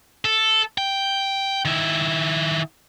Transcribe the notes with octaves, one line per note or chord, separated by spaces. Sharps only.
A4
G5
D#3 E4